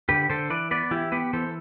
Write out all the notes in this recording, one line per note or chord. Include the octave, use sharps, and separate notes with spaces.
D3 G4 B4
D3 A4 C5
E3 B4 D5
B3 B4 D5
E3 E4 G4
B3 G4 B4
E3 A4 C5